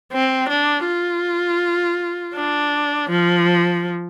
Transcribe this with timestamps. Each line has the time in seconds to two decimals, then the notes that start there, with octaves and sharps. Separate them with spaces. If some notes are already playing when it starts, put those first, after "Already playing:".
0.13 C4
0.49 D4
0.87 F4
2.35 D4
3.10 F3